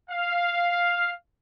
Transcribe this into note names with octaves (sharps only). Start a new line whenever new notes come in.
F5